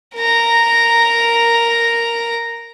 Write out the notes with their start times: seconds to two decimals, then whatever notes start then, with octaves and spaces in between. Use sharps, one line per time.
0.16 A#4 A#5